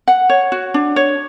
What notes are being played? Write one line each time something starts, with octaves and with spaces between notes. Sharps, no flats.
F#5
C#5
F#4
D4
C#5